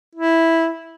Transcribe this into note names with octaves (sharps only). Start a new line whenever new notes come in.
E4